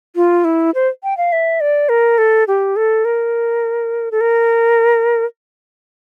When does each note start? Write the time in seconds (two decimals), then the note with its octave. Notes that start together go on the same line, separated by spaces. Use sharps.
0.16 F4
0.45 E4
0.75 C5
1.03 G5
1.17 F5
1.32 E5
1.61 D5
1.89 A#4
2.18 A4
2.48 G4
2.76 A4
3.05 A#4
4.12 A4
4.21 A#4